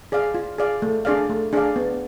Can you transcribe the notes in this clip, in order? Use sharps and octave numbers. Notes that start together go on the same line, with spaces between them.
G#4 D5 F5
F4
G#4 D5 F5
A3
D4 G#4 D5 F5
A3
D4 G#4 D5 F5
B3